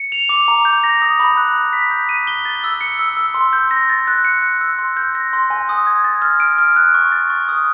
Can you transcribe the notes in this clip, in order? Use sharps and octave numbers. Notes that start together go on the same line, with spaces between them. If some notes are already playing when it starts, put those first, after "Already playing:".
Already playing: C#7
F7
D6
A#5
G6
A#6
D#6
B5
F#6
B5
B6
G6
D#7
G7
A6
E6
C#7
E6
E6
C6
G6
A#6
A6
F#6
C#7
F#6
E6
C6
G6
A#6
C6
G#5
D#6
G#6
A6
F6
D7
F6
F#6
C#6
A6
C#6
D#6